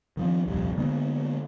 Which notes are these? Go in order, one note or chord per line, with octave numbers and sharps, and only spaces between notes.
D#3 F3 C4
D#1 C2 F2 C3
D3 G#3 A#3 B3